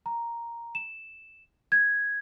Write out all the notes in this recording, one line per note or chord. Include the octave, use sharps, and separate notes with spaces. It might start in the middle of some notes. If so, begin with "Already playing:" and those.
A#5
E7
G#6